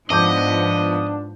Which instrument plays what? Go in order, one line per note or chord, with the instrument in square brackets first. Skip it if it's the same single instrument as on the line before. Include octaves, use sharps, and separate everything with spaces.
[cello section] G#2 F3 B3 [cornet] D4 [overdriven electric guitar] D#5 [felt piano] A5 D6 G6